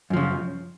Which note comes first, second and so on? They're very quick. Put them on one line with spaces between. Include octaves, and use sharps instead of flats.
F#2 F3 C#3